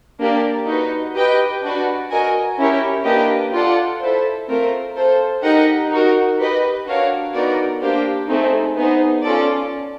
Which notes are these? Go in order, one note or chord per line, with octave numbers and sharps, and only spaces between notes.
A#3 D4 G4 A#4 D5
D#4 F#4 B4
G4 B4 D#5 G5
D4 F#4 B4 D5 F#5
F#4 A#4 D#5 G#5
C#4 E4 G4 A#4 C#5
A#3 D4 G4 B4 D#5
F4 A4 D5 F#5
E4 A4 C5
A3 C4 F4 A#4
F4 A4 C5
D#4 G4 A#4 D#5 F#5
D#4 F#4 A#4
G4 B4 D#5
D4 F#4 A#4 C#5 F5
B3 D#4 F#4 A#4 D5
A#3 D4 G4 C5 F5
A3 C4 D#4 G#4
B3 D#4 G#4 C5
C#4 F4 A4 D5